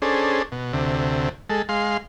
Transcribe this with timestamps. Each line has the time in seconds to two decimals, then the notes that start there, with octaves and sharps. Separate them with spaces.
0.02 C#4 D4 G#4 A4 C5
0.52 B2
0.73 D2 C3
1.50 G#3 A4
1.69 G#3 F5 C6